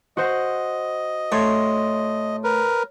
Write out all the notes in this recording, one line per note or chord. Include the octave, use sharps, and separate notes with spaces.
F#4 C5 D#5 F#5
A2 C#5 C6
A#4 B4